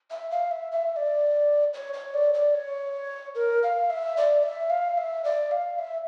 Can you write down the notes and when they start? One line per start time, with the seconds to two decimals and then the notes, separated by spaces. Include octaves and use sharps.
0.11 E5
0.31 F5
0.51 E5
0.72 E5
0.92 E5
0.96 D5
1.74 C#5
1.94 C#5
2.14 D5
2.34 D5
2.55 C#5
3.35 A#4
3.63 F5
3.90 E5
4.17 D5
4.43 E5
4.70 F5
4.98 E5
5.24 D5
5.51 F5
5.79 E5